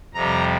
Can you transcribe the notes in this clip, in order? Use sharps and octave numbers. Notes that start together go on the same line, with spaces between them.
F2 C3 G3 A#5